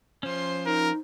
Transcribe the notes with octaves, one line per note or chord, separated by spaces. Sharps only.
F3 C#4 C5 C6
D#4 A#4